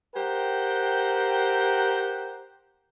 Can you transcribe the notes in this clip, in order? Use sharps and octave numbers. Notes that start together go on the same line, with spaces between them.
G4 A#4 C5 F#5 G5